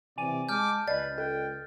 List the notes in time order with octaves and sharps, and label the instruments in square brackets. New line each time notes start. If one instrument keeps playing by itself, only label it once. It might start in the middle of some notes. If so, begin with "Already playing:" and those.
[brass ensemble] C3 E3 [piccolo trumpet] D5 [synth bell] G#5 D#7
[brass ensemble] G#3 A5 [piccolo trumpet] D6 [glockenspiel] F6 G6
[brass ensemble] C#2 [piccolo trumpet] B4 [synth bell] D5 D#5 [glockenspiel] A6
[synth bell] A4 [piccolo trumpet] G5